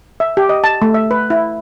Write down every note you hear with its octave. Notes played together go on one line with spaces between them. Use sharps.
E5
G4
D#5
A5
A3
E5
B4
E4